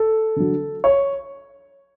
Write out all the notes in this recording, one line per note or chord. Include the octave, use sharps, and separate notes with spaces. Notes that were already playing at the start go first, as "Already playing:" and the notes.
Already playing: A4
D3 F#3
C#5